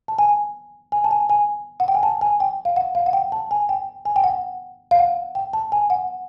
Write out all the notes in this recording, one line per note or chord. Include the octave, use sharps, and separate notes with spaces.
A5
G#5
G#5
A5
G#5
G#5
F#5
G5
G#5
A5
G#5
G5
F5
F#5
F5
F#5
G5
A5
G#5
G5
G#5
G5
F#5
F5
F#5
G5
A5
G#5
F#5